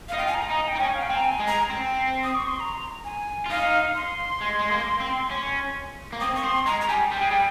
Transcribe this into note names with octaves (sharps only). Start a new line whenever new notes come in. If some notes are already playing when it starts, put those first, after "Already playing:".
F5
D#4
F4 G5
G#5
A#5
D#4
G5
D#4
C#4 G#5
F5
G5
C4
A#5
G#5
G#3
A#5
C4
D#6
C#6
C6
A#5
G#5
F4
D#4 F5
C6
G#3
G#3
A#3
C4
C#4
A#3
C4 D#6
C#6
C4 C6
G#3 A#5
A#5
G3 G#5
G3 G5
G#3
G3